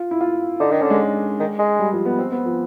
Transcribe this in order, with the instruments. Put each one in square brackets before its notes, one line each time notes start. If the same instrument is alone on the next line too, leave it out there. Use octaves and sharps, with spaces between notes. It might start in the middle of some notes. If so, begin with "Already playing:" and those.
Already playing: [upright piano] F4
E4
F4
[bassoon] D3 [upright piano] D#4
[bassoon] D#3 [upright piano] D4
[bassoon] D3 [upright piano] C#4
[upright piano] G#3
[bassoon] D#3
G#3
[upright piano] G3
F3
B3
C4
B3
F3